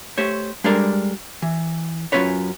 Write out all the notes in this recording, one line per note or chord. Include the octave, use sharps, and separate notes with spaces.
A3 G4 C5 C#5
G3 G#3 D4 A4 A#4 D5
E3
F#2 C4 C#4 F4 B4 C#5